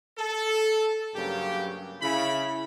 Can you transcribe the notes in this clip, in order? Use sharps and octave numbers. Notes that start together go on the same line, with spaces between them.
A4
G2 C#3 F#3 A#3 G4
C#3 E4 B5